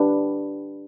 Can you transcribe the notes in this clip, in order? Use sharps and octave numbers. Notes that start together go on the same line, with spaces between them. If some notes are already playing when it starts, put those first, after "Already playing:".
Already playing: D4 G4 B4